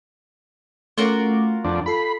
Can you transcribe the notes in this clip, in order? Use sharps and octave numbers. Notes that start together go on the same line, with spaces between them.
A3 C#4 F4 F#4 A#4 D6
F2 D4
F4 A4 B5 C7